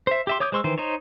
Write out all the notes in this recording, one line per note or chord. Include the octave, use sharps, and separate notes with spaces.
C5 E5
G4 E5 C6
C#5 D6 D#6 G6
G#3 C5 C6 C#6 E6
D#3 E3 C5
D#4 C5 C#5